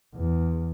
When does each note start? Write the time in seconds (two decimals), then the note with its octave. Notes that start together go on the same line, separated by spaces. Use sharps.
0.15 E2